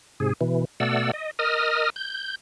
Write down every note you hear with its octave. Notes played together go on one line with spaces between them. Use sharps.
G#2 C3 G#4
B2 E3
B2 A3 D5 F#5 E6
D#5
A#4 D#5 D#6 F6
G6